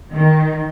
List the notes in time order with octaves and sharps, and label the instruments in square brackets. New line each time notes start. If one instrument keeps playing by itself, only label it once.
[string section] D#3